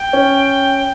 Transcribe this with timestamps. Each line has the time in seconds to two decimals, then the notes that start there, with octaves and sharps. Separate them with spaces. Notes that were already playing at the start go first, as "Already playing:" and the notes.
Already playing: G5
0.13 C#4